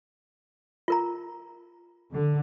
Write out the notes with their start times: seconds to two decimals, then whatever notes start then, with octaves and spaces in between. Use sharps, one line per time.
0.88 F4 A#4 A#5
2.11 D3